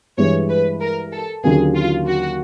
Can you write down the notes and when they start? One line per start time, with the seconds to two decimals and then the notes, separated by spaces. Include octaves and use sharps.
0.17 G2 E3 G#3 C#5
0.49 B4
0.80 A#4
1.12 A4
1.43 D#2 D3 F#3 A#3 C#4 G#4
1.75 F4
2.06 F#4